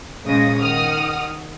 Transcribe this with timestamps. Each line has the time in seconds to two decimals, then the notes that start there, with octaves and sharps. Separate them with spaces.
0.23 A#1 C#3 G#3 D#6 A#6
0.58 D#3 F#5 D#6 F6